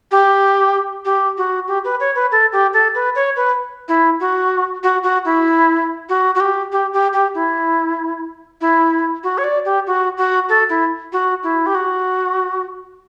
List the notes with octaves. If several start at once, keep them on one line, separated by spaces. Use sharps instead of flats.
G4
G4
F#4
G4
B4
C#5
B4
A4
G4
A4
B4
C#5
B4
E4
F#4
F#4
F#4
E4
F#4
F#4
G4
G4
G4
G4
E4
E4
F#4
C#5
D5
G4
F#4
F#4
A4
E4
F#4
E4
G4
F#4